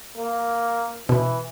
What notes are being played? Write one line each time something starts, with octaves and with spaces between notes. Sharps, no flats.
A#3
B2 E3